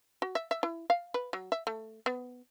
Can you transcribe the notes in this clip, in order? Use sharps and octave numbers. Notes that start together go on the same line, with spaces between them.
F#4
E5
E5
E4
F5
B4
F#3
E5
A3
B3